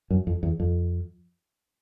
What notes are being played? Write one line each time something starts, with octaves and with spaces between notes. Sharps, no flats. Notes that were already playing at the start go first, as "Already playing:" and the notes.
F#2
F2
E2
F2